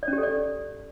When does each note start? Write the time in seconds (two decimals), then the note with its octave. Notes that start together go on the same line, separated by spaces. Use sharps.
0.03 D5
0.08 C#4
0.13 G4
0.18 A4
0.23 D5